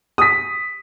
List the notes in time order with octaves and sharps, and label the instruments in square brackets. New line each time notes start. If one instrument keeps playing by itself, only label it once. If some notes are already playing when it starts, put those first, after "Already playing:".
[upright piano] D#6 B6